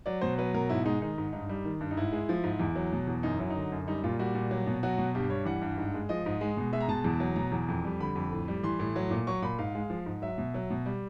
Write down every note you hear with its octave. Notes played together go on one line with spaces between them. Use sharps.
F#3 D5
B2 C5
F#3 B4
B2 A#4
G#2 E4
G#3 D#4
D#3 D#4
G#2
G2 D#4
G3
D#3
G2
D#4
G#2 E4
G#3
F3
G#2
E2
F#3
B2
E2
F#2 D#4
F#3 E4
D#4
D3
F#2
G3 D#4
A#2 F4
G3 F#4
A#2
F#3
B2
F#3 F#4
B2
G2 G4
G3 C#5
E3 F#5
G2
G#2
G#3
F3 D#5
G#2
G#3
B2
G#3 E5
A#5
B2 A5
E2
F#3
B2 A#5
E2
F2
G3
D3 B5
F2
A2
G3
E3 C6
A2
F#3
A#2
F#3 C#6
A#2 B5
G#2 F5
G#3
F3
G#2
F#3 E5
B2
F#3
B2
G3